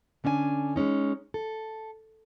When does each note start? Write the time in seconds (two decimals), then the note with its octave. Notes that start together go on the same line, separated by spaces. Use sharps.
0.24 D3 C#4 D4 D#5 G#5
0.76 G#3 A3 C#4 D#4
1.34 A4